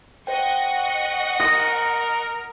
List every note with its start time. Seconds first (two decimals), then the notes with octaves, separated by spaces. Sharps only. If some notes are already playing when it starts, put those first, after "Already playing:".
0.27 C5 D#5 F#5 G5 C#6
1.40 A#4 D#6 A#6